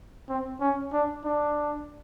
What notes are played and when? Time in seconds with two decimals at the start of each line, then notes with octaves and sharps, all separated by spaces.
0.30 C4
0.61 C#4
0.93 D4
1.25 D4